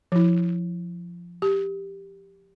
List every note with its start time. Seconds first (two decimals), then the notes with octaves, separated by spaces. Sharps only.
0.12 F3 E4
1.42 G4